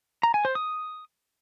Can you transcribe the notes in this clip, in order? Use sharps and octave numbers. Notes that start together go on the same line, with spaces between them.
A#5
G#5
C5
D#6